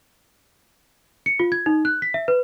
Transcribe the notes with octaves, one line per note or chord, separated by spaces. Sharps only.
C#7
F4
G#6
D#4
F#6
B6
E5
B4